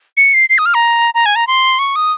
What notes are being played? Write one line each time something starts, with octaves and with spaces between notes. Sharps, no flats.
C#7
C7
C7
D#6
F6
A#5
A#5
G#5
A#5
C6
C#6
D#6